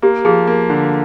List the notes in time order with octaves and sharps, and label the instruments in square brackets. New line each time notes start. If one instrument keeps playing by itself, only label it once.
[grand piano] A#3 [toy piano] G4
[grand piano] F3 [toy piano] G#4
[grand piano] A#3
D3